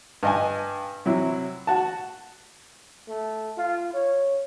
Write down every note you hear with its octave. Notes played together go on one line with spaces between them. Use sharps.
G2 D#5 G#5
C3 F#3 E4
F#4 A5
A3
F4
C#5